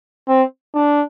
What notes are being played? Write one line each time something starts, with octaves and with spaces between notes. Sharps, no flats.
C4
D4